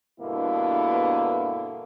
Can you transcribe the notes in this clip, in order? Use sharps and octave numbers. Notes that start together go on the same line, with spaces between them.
G2 B2 D3 A#3 B3 E4